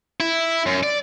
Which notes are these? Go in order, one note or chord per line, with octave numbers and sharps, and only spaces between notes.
E4
F#2
D5